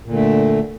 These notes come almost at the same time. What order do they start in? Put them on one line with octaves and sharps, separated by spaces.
A#2 D3 A3